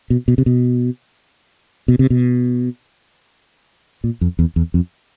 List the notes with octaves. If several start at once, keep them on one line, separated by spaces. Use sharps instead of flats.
B2
B2
C3
B2
B2
C3
B2
A#2
F2
E2
E2
F2